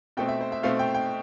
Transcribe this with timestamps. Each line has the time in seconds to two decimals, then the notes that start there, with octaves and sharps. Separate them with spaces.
0.17 B2 A3 C4 G5
0.28 E5
0.41 C5
0.52 E5
0.63 B2 A3 C4 F5
0.79 G5
0.94 G5